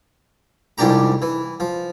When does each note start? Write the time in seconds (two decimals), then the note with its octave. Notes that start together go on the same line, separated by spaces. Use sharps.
0.78 C2 F2 G#2 D4 G4 A#5
1.22 E3
1.60 F3